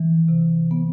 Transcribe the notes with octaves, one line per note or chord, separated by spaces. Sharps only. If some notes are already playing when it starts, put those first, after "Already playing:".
Already playing: E3
C3
B3